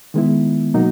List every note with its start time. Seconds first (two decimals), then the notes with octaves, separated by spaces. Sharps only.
0.14 D#3 G#3 B3 E4
0.74 B2 F#3 A#3 D#4 F#4